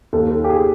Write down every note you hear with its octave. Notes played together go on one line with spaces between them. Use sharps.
D#2 A4
A4
G4
G#4